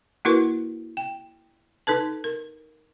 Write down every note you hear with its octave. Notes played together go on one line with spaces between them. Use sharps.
A#3 E4 F#4 A#4 B4
G5
D#4 A4 B4 A5
A#4